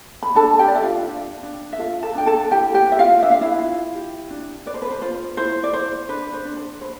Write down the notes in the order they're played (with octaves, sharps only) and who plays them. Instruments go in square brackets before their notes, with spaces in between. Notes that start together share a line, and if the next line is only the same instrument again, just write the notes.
[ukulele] B5
D4 A4 A5
A5
G4 G5
D5
D4 E5
F4 F5
D4
D4
E5
F4 A4 F5
A4 A5
D4 G5
A4 A5
E4 G4 G5
G4 G5
B4
E5
F4 F5
D4 E5
F5
E4 E5
F4
G4
D4
B4 D5
C5
B4
C5
F4 C5
E4 C5
D5
E4 C5
D4 B4
C5
D4
C5
B4 C5